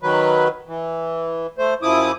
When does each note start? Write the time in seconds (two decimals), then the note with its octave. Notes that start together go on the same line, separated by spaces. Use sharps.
0.03 D#3 F#3 B4
0.68 E3
1.58 A3 C5
1.82 F#2 F3 E4 D6 D#6